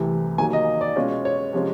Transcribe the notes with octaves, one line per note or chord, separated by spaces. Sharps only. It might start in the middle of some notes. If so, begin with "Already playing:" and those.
Already playing: C2 C3 E3 A3
C3 D#3 F#3 A#3 G#5
D#5
D5
B2 G#3 C#4 F4
C#5
C3 F3 G#3 C#4 F4